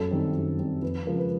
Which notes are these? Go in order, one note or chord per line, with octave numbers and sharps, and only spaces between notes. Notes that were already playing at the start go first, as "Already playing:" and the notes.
Already playing: F#2 A4
D#3 G3 C4
F#2
D#3 G3 C4
F2 B4
C#3 F3 G#3 A#4
B4